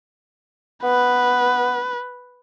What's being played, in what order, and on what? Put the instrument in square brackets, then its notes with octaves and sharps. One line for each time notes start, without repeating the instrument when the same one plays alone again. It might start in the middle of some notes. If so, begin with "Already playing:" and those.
[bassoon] B3 [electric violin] B4